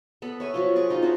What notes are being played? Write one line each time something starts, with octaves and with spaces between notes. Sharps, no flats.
B3 A4 B5
C#5 E5 G#5 B5
F3 F#3 F4
G#4 D5 C#6
D#4 F4 F#4
D4 E4 F#4 C5